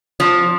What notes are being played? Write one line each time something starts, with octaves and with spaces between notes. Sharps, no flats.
F3